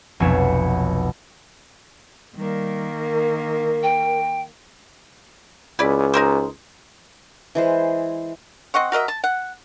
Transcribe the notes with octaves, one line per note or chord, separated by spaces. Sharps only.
F1 B1 B4 C#5 E7
D#3 G3 A#3
A#4
G5
C#2 E4 B4 D5
D#4 A#4 C5
E3 G#3 C5
C4 D#5 F#5 C#6
F#4 A#4 D#5 E5
A5
F#5